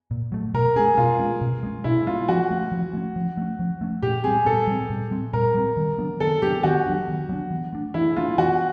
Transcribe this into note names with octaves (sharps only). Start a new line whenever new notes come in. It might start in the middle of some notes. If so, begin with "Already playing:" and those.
A#2
F#3 A3
B2 A#4
G#3 C#4 G#4
B2 F4
G#3 C#4
B2
G#3 C#4
B2 E4
G#3 C#4 F4
F3 F#4
A3 C#4
F3
A3 C#4
F3
A3 C#4
F3
A3 C#4
A#2 G4
G3 C4 G#4
A#2 A4
G3 C4
A#2
G3 C4
A#2 A#4
G3 C4
D#3
F#3 B3 D4
D#3 A4
F#3 B3 D4 G4
D#3 F#4
F#3 B3 D4
D#3
F#3 B3 D4
E3
A3 D4
E3 E4
A3 D4 F4
E3 F#4